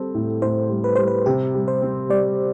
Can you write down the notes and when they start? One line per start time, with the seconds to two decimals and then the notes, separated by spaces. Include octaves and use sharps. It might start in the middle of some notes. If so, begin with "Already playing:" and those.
Already playing: G3 C4 A4
0.15 A2
0.42 A2 C5
0.69 G3
0.84 B4
0.96 G3 C5
1.08 B4
1.26 C3 G4
1.55 G3
1.68 C5
1.82 C4
2.09 G3 D5